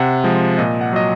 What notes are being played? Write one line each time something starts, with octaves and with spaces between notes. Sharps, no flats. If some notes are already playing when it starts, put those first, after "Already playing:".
Already playing: C3 F#5
F3 G#3
A#2 D#5
F#5
F#3 D#5